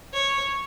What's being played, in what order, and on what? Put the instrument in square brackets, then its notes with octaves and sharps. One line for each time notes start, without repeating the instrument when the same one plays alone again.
[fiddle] C#5